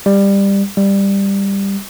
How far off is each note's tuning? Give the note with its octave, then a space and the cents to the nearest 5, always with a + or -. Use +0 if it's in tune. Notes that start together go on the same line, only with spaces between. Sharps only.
G3 +15
G3 +10